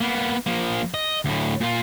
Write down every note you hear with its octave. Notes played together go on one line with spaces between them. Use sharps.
A#3 B3
F3 A#3
D#5
D2 A2
A#2 F4